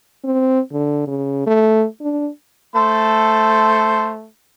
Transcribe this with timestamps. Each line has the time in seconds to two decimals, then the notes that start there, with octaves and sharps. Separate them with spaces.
0.24 C4
0.72 D3
1.07 C#3
1.46 A3
2.01 D4
2.76 A3 A4 C5